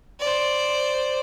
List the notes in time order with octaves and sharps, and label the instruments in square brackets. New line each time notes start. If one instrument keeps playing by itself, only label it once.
[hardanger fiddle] C5 D5